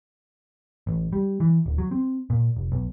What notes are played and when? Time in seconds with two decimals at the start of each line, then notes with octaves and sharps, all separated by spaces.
0.87 A1
1.13 G3
1.40 E3
1.66 D1
1.78 F#3
1.91 C4
2.30 A#2
2.56 F1
2.72 B1